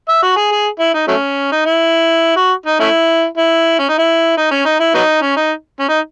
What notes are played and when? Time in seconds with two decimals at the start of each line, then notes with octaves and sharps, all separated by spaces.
0.09 E5
0.22 F#4
0.36 G#4
0.52 G#4
0.80 E4
0.94 D#4
1.08 F#3 A3 C#4
1.52 D#4
1.65 E4
2.37 F#4
2.66 D#4
2.80 A3 C#4 E4
3.37 E4
3.79 C#4
3.89 D#4
3.99 E4
4.37 D#4
4.51 C#4
4.66 D#4
4.80 E4
4.94 F#3 B3 D#4
5.22 C#4
5.36 D#4
5.80 C#4
5.89 D#4